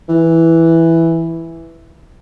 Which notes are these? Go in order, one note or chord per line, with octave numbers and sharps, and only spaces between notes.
E3